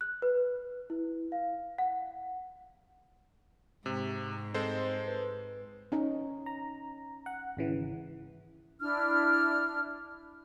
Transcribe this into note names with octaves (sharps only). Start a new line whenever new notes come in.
F#6
B4
E4
F5
F#5
G#2 C3
G#3 C4 A4 C5
B4
C#4 D#4
A#5
F#5
G#1 C#3 E3
D4 E4 F6